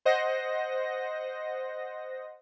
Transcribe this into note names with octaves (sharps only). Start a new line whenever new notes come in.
C5 D#5 F#5 A#6